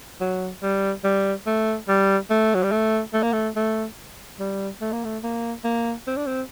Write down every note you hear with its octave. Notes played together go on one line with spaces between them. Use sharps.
F#3
G3
G3
A3
G3
A3
F#3
G3
A3
A3
A#3
A3
A3
G3
A3
A#3
A3
A#3
A#3
C4
D4
C4